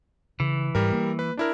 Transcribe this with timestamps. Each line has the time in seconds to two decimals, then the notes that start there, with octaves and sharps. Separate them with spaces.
0.40 C#3 E3
0.75 G#2 G3 A#4
0.93 A#3
1.19 B4
1.37 D4 E4 A#4